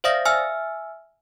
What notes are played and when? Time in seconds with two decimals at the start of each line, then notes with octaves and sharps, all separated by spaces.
0.04 C5 D5 E5 F5 D#6 A#6
0.25 E5 G#5 E6 F6